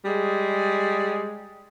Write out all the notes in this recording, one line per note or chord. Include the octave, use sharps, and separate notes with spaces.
G3 G#3 G#4